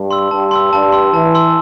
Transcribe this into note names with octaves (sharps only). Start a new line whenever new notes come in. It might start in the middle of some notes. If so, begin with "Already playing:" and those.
Already playing: G2
C6 E6
G2 A5
C6 E6
G2 A5
C6 E6
E3 A5
C6 E6